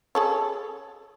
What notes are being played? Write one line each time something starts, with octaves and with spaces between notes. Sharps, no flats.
G#4 A4 C#5